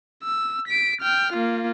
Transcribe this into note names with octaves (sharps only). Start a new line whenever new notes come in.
E6
B6 D7
G5 F6
A#3 F4